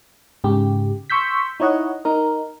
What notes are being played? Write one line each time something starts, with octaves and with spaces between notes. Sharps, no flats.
G#2 C#3 G4
C6 C#6 E6 G6 B6
D#4 E4 C#5 D#5 F#5
D#4 A#4